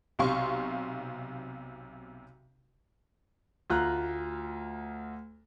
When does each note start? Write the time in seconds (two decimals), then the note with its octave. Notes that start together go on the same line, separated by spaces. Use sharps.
0.19 B1 C3 F5 C6 C#6
3.70 D2 F4 A#5 F#6